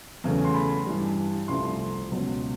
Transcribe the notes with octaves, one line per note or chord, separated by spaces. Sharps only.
E2 C#3 F#3 A3
C6
B5
G2 E3 G3
C2 C3 F3 A3 C6
C#2 B2 F#3